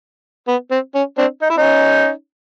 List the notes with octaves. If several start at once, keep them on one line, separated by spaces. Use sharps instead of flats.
B3
C4
C#4
C4 D4
D#4
E4
C#4 D#4